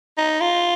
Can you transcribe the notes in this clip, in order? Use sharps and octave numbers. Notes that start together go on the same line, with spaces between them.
D#4
F4